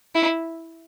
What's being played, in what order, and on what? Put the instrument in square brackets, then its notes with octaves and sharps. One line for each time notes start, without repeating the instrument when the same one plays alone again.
[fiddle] E4